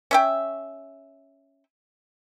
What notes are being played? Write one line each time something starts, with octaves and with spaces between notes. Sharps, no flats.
C#4 E5 G5